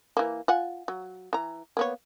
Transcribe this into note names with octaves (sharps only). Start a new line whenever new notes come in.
E3 A#3
F4 F#5 G#5
F#3
E3 A#5
A#3 B3 C#5